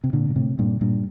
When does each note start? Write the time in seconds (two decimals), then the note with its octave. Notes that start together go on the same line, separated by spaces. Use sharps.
0.04 C3
0.13 A#2 D3
0.29 A#2
0.36 A2 C3
0.59 G2 A#2
0.81 G2 A#2